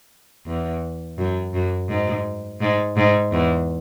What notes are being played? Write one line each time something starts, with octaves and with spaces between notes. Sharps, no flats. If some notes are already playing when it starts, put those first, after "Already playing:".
E2
F#2
F#2
G#2
G#2
G#2
E2